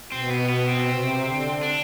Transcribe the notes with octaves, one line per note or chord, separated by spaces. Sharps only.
B2 C4
B3
B3
C4
C3
D3
D4